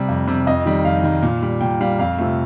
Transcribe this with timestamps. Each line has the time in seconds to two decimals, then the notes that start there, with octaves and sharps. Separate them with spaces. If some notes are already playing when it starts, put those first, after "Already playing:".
Already playing: C3 G3
0.09 F2
0.27 C3 G3
0.47 F2 D#5
0.66 D#3 G3
0.85 F2 F5
1.03 D#3 G3
1.23 A#2
1.42 G3
1.61 A#2 G5
1.81 G3 F5
1.99 F2 F5
2.18 C3 F3 A3